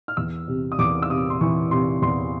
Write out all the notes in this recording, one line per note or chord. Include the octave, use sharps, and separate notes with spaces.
F6
E2 E6
C3
D#6
E2 D6
E6
C3 D#6
C6
E3 C#6
C3 C6
E2 C6